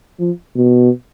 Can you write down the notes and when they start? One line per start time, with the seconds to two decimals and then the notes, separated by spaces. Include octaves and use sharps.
0.19 F3
0.56 B2